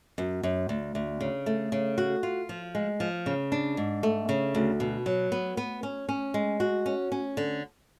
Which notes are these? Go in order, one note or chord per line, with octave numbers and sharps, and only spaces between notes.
F#2
F#2
D2
D2
C#3
A3
C#3
F#4
F4
F3
G#3
F3
C#3
D4
G#2
A3
C#3
D2
B2
F#3
B3
B3
C#4
C#4
G#3
F#4
C#4
C#4
D3